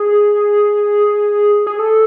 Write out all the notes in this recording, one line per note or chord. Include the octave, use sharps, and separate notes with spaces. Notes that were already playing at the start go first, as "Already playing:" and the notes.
Already playing: G#4
G#4
A4